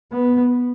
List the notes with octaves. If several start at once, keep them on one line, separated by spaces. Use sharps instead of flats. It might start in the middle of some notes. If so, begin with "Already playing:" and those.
B3